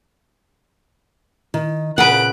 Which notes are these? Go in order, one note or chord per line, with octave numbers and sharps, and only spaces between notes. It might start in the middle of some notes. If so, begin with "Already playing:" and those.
D#3
A#2 C#3 B4 F#5 F#6 D7